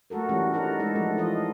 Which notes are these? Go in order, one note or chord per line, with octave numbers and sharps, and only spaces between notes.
A3 A#3 F#4 A4 A#4
E3 G3 A3 C#4 F4 F#4
D4 D#4 A#4 F#5
G#3 D#4 A4
F3 A3 D4
E3 F4 D#5